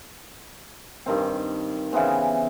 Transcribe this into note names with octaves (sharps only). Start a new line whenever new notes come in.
G2 D#3 C4
C#3 E3 B3 C4